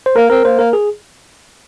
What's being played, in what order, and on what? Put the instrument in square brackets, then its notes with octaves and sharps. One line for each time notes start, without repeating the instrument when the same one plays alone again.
[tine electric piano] C5
[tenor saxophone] A#3 [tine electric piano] A#4
[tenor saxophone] C4 [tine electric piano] A#4
[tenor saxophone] A#3 [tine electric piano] C5
[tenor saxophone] A#3 [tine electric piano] A#4
[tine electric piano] G#4